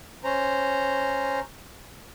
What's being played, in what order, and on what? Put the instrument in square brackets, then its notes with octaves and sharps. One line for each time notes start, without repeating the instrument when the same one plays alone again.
[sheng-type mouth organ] C#4 C5 A#5